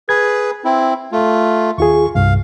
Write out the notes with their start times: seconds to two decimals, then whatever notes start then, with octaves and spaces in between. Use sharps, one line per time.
0.09 G#4 B4 G#6
0.65 C4 E4
1.12 A3 F4
1.78 D#2 F4 G#4 C#6
2.15 C2 G2 F5